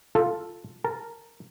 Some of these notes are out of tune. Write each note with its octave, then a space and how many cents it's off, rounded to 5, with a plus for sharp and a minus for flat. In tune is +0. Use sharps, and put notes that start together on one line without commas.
F4 +0 A4 +0
A#4 -10 A5 +0